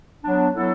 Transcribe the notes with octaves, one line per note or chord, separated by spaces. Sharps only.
F#3 B3 D4
F#3 B3 E4 A4